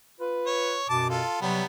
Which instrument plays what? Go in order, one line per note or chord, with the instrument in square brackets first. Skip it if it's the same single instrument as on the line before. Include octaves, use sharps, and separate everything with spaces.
[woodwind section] F4 B4
[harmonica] C#5
[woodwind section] F#2 B2 [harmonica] A5 D6
[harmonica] F4 A4
[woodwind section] C3 F#3 [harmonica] G3 B3